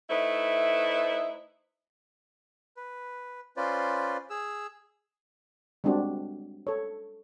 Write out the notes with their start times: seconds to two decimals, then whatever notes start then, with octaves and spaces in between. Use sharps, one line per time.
0.10 A3 D#4 E4 B4 C5
2.77 B4
3.57 C#4 F4 B4 C5 D5
4.30 G#4 E6
5.84 G3 G#3 C4 D4 F#4 G4
6.67 A4 C#5